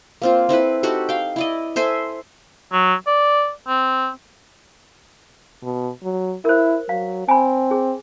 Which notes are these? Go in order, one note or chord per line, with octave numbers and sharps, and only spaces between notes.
A#3 C4 F4
C4 E4 A4 B4
D#4 F#4 G4 A4
F5 G5
E4 D5 D#5
A4 C5 E5 G#5
F#3
D5
C4
B2
F#3
E4 A#4 C5
F#3 F5
C4 G#5 B5
G#4